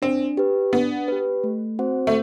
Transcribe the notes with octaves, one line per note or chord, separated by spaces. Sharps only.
C4 D4
G4 B4
B3 D4
G4 B4
A3
C4 F#4 C5 F#5
A3